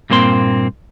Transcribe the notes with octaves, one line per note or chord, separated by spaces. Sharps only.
G2 A#2 A#3 C4 C6